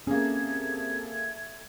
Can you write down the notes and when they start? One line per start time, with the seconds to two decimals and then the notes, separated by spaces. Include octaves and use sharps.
0.07 C3 A#3 C#4 G#4 A4 E5 G#6